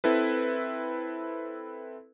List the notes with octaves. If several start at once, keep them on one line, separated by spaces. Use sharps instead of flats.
C4 E4 A4 B4